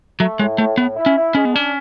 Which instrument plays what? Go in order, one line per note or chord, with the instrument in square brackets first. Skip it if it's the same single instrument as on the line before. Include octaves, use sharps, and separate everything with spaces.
[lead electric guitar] F#3 [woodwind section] A3
[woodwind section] A2 [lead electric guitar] G#3
[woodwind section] A2 [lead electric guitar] A3
[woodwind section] A2 [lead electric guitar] B3
[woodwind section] E4
[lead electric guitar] C#4
[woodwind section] E4
[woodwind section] G#3 [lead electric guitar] C#4
[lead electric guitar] B3
[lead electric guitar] C#4 [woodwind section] D4